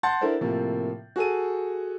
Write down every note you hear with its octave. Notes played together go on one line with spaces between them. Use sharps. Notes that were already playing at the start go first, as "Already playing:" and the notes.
F#5 A5 C6 G6 A6
D4 E4 A4 A#4 C5
A2 C3 F3 A#3
F#4 G#4 A4 D#7